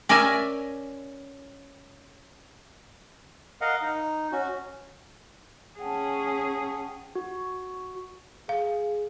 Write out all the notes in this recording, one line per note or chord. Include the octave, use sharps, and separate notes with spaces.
C#4 A#4 D5 E5 G#5
A#4 D#5 F5 F#5
D#4
C#4 F#4
C#4 G#4 F#5 G5 A5
F#4
G#4 F5